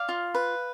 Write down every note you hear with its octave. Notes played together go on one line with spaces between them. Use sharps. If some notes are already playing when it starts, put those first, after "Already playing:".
Already playing: D5 F5
F4
B4